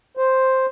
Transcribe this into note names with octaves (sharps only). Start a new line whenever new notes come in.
C5